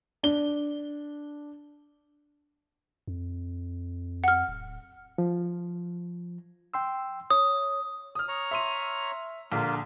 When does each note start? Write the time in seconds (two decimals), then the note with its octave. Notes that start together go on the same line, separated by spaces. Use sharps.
0.23 D4 G7
3.08 F2
4.24 F#5 F6
4.48 D1
5.18 F3
6.74 G5 C6 E6
7.30 C#5 D#6
8.15 D#6 F6
8.28 C#5 A#5
8.51 E5 C6 D#7
9.52 A#1 D3 A#3 F4